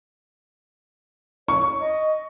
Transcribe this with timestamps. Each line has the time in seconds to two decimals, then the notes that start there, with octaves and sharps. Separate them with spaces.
1.48 C#5 C#6
1.80 D#5